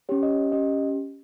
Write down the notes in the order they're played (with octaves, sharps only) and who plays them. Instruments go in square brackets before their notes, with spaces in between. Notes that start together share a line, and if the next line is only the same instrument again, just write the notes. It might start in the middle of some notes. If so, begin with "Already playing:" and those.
[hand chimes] C#4 G4 C#5
D#5
C#4 G4 D#5